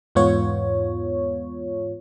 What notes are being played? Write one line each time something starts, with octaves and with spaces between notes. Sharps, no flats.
E2 G#2 B3 F4 C#5